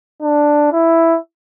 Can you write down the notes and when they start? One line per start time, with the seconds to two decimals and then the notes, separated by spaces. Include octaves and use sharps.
0.22 D4
0.72 E4